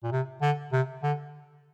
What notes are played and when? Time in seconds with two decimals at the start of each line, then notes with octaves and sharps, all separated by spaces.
0.04 A#2
0.12 C3
0.42 D3
0.72 C3
1.03 D3